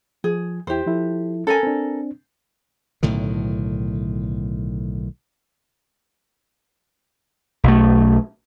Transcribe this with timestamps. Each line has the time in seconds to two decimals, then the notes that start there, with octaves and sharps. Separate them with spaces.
0.24 F3 G#4
0.67 E2 E4 G4 C5
0.86 F3 E4 A4
1.47 C#4 A4 A#4 G#5
1.63 C4 D4
3.03 B1 A2 D3 D#3
7.64 B1 A3